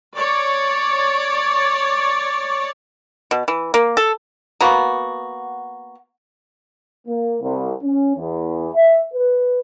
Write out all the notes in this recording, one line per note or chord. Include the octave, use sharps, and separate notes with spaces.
C#5 D5
B2
E3
A#3
A4
A#3 B3 F#4
A#3
C2
C#4
E2
E5
B4